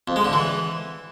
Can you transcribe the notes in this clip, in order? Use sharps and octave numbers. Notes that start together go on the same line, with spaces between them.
F2
G#3
D3
E3